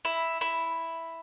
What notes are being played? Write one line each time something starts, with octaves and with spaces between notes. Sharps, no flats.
E4
E4